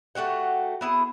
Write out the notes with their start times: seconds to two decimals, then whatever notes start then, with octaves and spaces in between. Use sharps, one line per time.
0.15 A3 F#4 G4 F#5
0.81 B3 E4 G#4